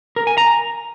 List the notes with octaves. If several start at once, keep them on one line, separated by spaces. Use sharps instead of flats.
A#4
G#5
A#5